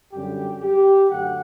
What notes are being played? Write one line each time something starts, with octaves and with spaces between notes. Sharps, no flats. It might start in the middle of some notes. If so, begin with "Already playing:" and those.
F#2 D3 G3 C#4 G4
G4
F#2 D3 F#3 A3 F#5